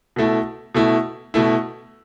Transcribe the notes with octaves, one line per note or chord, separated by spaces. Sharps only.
B2 A3 E4
B2 A3 E4
B2 A3 E4